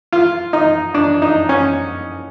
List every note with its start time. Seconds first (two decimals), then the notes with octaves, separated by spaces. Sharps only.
0.13 F4
0.53 D#4
0.94 D4
1.22 D#4
1.49 C#4